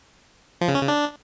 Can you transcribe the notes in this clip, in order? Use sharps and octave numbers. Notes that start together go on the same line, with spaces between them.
F3
C#3
C#4
C#3
D4